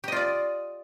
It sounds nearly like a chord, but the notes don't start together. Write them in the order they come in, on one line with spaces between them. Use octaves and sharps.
G4 D#5 F4 D5